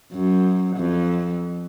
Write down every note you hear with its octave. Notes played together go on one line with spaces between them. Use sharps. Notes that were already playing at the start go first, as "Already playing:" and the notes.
F#2
F2